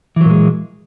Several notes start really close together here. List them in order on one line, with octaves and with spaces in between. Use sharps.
E3 F#3 A#2 G#3